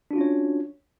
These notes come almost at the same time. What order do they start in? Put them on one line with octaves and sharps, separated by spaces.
D4 F#4 F4 C#4 C#5